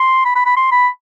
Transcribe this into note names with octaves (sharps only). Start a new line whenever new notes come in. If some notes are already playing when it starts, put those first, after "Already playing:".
Already playing: C6
B5
B5
B5
C6
B5